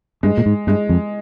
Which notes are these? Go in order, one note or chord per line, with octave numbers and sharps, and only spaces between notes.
G2 G#3
A#2
G#2
G2 G#3
F2